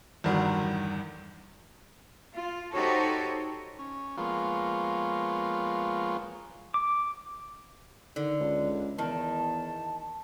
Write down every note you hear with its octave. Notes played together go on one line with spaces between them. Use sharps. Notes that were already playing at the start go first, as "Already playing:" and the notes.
E2 G2 D3 D#3 F#3
F4
D#4 F#4 G4 A4 C5 C#5
C#4
F3 G#3 A#3 B3 F4 C#5
D6
D3 D#3
C#2
E2 D#3 A5